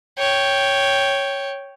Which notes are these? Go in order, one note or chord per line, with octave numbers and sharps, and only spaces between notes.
C#5 G5